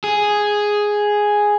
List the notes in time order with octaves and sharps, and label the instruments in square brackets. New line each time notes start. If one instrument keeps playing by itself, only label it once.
[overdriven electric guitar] G#4